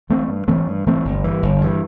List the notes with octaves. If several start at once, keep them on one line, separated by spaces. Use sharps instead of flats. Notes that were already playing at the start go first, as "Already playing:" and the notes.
E3 A3 C4
G2
E3 A3 C4
G2
E3 A3 C4
G1
G2 E3
G1
G2 E3